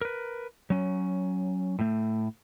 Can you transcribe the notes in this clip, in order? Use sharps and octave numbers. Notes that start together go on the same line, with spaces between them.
A#4 B4
F#3 C#4
A2 A3